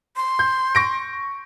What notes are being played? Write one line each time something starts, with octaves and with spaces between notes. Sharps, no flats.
C6
G6
C#6 A#6 D7